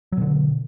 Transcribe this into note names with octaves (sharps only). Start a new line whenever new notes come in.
B2 D3 F#3